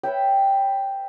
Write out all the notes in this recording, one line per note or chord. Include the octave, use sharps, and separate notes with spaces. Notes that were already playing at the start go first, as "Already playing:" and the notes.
B4 C#5 E5 G5